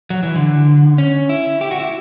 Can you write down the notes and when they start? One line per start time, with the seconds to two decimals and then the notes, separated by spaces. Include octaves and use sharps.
0.10 F#3
0.23 E3
0.35 D3
0.98 C#4
1.29 E4
1.61 G4
1.71 F#4
1.80 E4